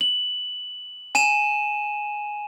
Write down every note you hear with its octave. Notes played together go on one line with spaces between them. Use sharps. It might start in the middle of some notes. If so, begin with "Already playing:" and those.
F#7
G#5 D#7 E7